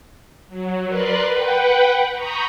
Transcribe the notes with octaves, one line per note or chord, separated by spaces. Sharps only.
F#3
A#4 B4 D5 C6 F#6
B4 F#5 G5
A#5 B5 C#6 D#6 G6